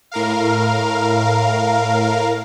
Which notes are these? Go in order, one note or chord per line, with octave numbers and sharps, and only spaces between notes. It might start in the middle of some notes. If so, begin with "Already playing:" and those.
A2 A#4 F5